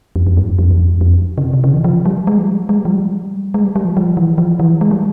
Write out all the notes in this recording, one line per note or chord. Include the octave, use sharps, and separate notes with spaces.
F2
F2
G2
F2
F2
E2
F2
F2
C#3
C3
C3
C#3
E3
F3
G3
G#3
F3
G3
G#3
G3
F3
G3
G#3
G3
G3
F3
F3
E3
F3
E3
G#3
G3